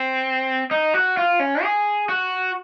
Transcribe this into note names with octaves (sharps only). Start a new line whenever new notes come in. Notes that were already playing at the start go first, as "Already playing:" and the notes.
Already playing: C4
D#4
F#4
F4
C#4
G#4
F#4